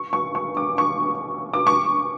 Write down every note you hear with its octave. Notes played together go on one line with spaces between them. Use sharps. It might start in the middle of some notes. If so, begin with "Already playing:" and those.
Already playing: C#6
C#6
C#6
D6
C#6
D6
C#6